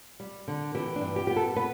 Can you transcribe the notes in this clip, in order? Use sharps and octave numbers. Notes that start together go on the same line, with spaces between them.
G3
D3
E3 G4
D4
G2
G4
B3 G4
A4
B3 B4